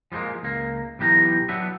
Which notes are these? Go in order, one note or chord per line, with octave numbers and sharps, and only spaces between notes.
F3 G3 G#3 A#3
C#2 A#3
B1 E3 G4 E5 A#5
F#3 B3 D4 E5